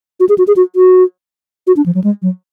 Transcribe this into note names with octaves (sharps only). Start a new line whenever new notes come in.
F#4
G#4
F#4
G#4
F#4
F#4
F#4
D4
F3
F#3
G#3
F#3